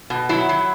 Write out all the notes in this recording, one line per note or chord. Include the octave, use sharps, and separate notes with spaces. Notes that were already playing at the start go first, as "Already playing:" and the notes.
B2
F#3 E4
F#3